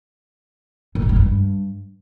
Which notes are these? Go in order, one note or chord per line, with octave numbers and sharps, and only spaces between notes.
A2
C#3
G#2
G2